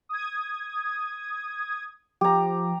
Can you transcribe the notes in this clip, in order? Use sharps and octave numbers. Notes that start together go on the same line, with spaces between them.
D#6 G#6
F3 G4 A#5